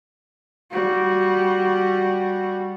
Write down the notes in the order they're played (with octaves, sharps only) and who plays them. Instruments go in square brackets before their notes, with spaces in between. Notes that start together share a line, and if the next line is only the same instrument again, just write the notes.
[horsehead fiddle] G3 F#4